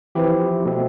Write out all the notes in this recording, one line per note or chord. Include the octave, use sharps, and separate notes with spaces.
E3 F3 C4 E4 G4
B2 A3 C4